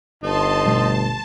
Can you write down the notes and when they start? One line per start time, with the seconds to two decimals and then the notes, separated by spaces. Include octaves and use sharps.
0.23 G1 D#4 A5 C6
0.66 B2 G3 A3 A5